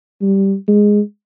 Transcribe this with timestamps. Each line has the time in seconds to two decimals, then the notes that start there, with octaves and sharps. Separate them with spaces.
0.22 G3
0.68 G#3